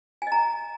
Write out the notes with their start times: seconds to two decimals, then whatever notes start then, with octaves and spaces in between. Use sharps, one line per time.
0.22 G#5
0.27 D#5
0.32 A#5